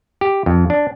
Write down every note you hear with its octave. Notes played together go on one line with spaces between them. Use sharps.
G4
F2
D4